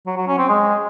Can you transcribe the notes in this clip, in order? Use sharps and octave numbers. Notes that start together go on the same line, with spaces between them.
F#3
F#3
C#4
C4
G#3